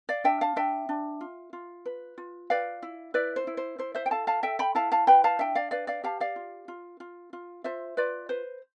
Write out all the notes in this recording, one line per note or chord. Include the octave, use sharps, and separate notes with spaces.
D5 F5
D4 E5 G5
F5 A5
D4 E5 G5
D4
F4
F4
B4
F4
B4 D5 F5
E4
E4 B4 D5
C5
E4
C5
E4 C5
C5 E5
G5
A4 F5 A5
F5 A5
A4 E5 G5
G5 B5
E4 F5 A5
F5 A5
B4 G5 B5
F5 A5
D4 E5 G5
D5 F5
B4 D5 F5
D5 F5
G4 F5 A5
D5 F5
F4
F4
F4
F4
F4 C5 E5
F4 B4 D5
B4 C5